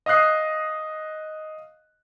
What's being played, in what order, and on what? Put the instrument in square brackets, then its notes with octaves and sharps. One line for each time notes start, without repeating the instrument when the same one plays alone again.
[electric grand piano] D#5 F5 D#6 F#6 C7